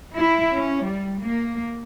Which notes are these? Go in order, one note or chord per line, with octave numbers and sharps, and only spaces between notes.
E4
C#4
G3
A#3